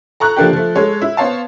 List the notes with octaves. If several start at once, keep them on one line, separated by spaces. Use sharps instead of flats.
A4 A#5 C#6 F#6
F3 A3 A#3 D4 G4
F3 A3
G#3 A4 C#5
E4
B3 C5 C#5 F5 A5